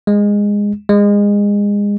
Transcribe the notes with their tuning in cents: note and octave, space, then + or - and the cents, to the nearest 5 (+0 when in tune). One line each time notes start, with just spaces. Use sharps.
G#3 -15
G#3 -25